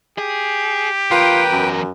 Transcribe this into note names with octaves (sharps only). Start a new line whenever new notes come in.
G4 G#4
E2 F4 A#4 B4 G5
F#2